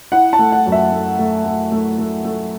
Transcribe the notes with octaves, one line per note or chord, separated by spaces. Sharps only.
E4 F#5
A5
A3
F#5
F#2
E5
A3
A3
A3
A3
A3
A3